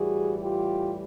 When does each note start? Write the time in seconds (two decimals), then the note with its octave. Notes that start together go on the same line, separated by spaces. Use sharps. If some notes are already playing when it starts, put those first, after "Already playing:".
Already playing: A2 E3 G3 F#4 G#4
0.38 F4 G4